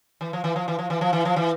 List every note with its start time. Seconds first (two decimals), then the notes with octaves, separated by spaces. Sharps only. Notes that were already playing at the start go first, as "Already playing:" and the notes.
0.21 E3
0.33 F3
0.44 E3
0.56 F3
0.68 E3
0.79 F3
0.90 E3
1.01 F3
1.13 E3
1.25 F3
1.36 E3